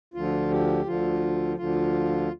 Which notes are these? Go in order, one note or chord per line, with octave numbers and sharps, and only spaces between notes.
D2 D3 F3 F4
G4
D2 D3 F3 F4
D2 D3 F3 F4